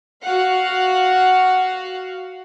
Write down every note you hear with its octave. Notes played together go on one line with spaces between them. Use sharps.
F#4 F5 F#5